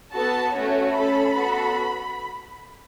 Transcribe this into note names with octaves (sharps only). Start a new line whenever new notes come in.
B3 F#4 A4 A5
A3 C#4 F#4 C#5
C#4 A4 B5
B3 F#4 A4